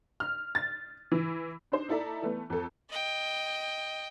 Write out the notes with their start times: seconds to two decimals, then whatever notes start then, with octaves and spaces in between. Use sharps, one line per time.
0.20 F6
0.55 A6
1.12 E3
1.72 D4 D#4 C5
1.89 D#4 E4 A4 D5 E5 A#5
2.22 E3 A3 B3
2.50 F2 A4
2.90 D#5 G5